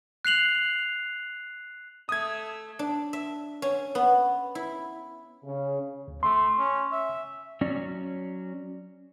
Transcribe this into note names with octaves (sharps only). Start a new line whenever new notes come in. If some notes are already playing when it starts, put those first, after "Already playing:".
F#6 C7 F7 F#7
A3 E5 D#6 G#6
D4
E5
C#4
B3
E4
C#3
D2
A3 C6
C#4
E5
F#3 C#4 D5